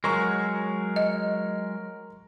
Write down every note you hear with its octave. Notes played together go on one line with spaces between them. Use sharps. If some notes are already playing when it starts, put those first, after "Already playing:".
F#3 G#3 A#4 C#6
D#5